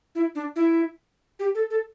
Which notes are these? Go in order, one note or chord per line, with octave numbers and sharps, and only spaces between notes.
E4
D4
E4
G4
A4
A4